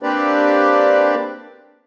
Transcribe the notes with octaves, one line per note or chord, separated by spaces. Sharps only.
A#3 C4 D4 G4 B4 D5